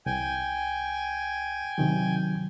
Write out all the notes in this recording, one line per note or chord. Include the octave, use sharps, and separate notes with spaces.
C2 G5 G#5
C3 D#3 F#3